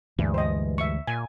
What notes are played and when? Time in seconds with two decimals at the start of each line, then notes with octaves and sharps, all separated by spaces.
0.18 D2 G2 E3 G#3
0.34 C5 D#5
0.78 E5 C#6
1.07 A#2 G#5